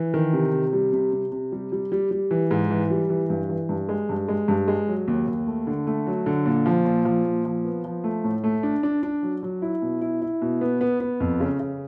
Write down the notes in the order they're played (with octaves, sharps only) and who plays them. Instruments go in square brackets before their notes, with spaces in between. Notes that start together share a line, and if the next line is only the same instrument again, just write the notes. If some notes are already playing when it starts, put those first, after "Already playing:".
Already playing: [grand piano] E3
D#3
C3
C3
G3
C3
C3
C3
G3
G3
G3
G3
E3
G#2
E3
G3
E3
G2
E3
G2
G#3
G2
G#3
G2
G#3
F#3
D#2
D#2
A3
D3
A3
F#3
D3
A#2
F3
A#2
F3
A#2
F3
B3
F3
A3
A2
A3
D4
D4
D4
F#3
F#3
E4
B2
E4
E4
B2
B3
B3
B3
F2
C#3
C#3